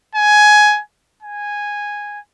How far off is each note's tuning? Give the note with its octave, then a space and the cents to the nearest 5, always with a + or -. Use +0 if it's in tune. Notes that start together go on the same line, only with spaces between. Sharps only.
G#5 +15
G#5 -10